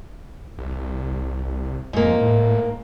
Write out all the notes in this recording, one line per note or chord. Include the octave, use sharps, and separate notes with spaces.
C2
F2 G#2 A#3
A2